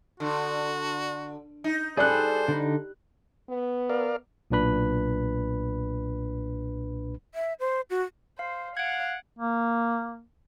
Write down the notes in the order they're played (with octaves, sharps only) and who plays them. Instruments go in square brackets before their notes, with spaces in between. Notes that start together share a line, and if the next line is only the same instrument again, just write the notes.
[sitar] D3 [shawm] F#4
[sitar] D#4
[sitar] G3 [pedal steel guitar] G#4 A4 [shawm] C5 [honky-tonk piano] D5 F#6
[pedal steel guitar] D3 D#4
[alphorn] B3
[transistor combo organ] A#4 D5 F5
[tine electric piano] B1 A#2 D4 B4 B5
[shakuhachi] E5
C5
F#4
[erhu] C5 [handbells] F5
[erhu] F5 [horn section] F#5 [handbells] G#6 D7
[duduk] A#3